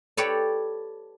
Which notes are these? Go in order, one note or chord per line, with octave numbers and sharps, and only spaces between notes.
G4 A4 B4 C#5 D5